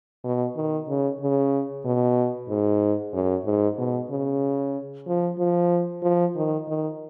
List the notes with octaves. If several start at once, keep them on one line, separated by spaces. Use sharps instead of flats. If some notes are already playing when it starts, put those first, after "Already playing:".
B2
D#3
C#3
C#3
B2
G#2
F#2
G#2
B2
C#3
F3
F3
F3
D#3
D#3